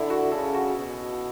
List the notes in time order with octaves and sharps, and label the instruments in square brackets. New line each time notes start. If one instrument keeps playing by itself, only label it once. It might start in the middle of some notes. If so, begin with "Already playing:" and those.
Already playing: [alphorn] D3 [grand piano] E4
[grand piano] F#4
[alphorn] C#3 [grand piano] A4
[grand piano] F#4
[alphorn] B2